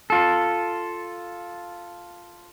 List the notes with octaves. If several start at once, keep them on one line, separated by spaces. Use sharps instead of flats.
F4 A4